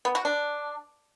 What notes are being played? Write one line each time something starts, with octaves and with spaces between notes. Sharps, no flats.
B3
F#4
D4